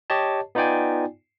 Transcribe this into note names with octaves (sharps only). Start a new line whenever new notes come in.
G4 C#5 D#5 A5
B3 D#4 F4 D5 G5 G#5